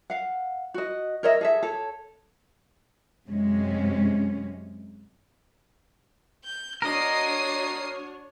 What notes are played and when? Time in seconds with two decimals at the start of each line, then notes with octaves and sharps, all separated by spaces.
0.10 F5 F#5
0.74 F#4 D#5
1.23 A#4 C#5 D#5 E5
1.41 G#4 A4 E5
1.63 A4 C#5
3.28 F#2 C3 G#3 C#4
6.45 G6
6.82 D4 F#4 A#4 C#5 D#5 D#6 C7